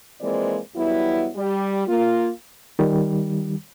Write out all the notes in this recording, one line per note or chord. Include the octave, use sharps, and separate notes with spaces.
E3 F3 G#3 A#3 C4 D5
E2 F#3 G3 B3 E4
G3
A#3 F4
D#3 G3